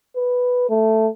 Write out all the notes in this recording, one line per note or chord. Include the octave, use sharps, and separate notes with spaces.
B4
A3